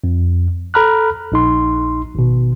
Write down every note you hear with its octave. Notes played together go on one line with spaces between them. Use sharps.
F2
A4 A#5 B5 F6 F#6
A#1 D#4 C6
G#1 B2